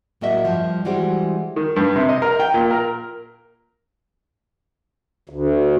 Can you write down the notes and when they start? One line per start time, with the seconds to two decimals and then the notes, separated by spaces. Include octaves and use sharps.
0.21 A2 F#3 A#3 F#4 D#5 E5
0.45 G2 F3
0.85 E3 G3 G#3 F#4 G4 C5
1.56 D#3
1.76 G2
1.96 C3
2.09 D#5
2.22 A#4
2.40 G5
2.54 A#2
2.71 A#4
5.29 D2